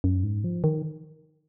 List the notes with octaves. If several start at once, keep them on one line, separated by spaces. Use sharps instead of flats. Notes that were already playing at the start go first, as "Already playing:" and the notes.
F#2
G#2
F3
D#3